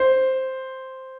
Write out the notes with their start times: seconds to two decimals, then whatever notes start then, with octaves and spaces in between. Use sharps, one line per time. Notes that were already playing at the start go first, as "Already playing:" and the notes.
Already playing: C5